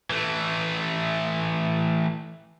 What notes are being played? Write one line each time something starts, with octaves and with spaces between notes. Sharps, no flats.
E3 A3